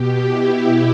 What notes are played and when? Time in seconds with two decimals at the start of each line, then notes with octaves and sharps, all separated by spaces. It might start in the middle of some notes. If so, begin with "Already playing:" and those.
Already playing: B2 G4
0.26 E4